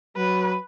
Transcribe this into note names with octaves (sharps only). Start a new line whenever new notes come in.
F#3 B4